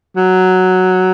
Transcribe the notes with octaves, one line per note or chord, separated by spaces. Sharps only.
F#3